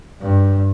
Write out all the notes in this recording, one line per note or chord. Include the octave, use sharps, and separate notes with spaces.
G2